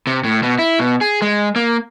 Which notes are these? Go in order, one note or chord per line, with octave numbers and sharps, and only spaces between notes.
C3
A2
B2
E4
B2
G#4
G#3
A#3